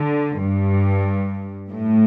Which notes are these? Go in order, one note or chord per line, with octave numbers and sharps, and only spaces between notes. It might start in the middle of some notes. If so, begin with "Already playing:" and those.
Already playing: D3
G2
A2